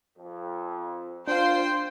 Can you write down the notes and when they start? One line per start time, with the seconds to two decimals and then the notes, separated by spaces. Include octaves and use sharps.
0.18 F2
1.28 A#2 D4 F4 C5 F5 G5 C6